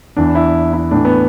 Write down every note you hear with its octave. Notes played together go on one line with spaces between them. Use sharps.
E2 E3 D4
E4
E4
A2 E3 D4
B3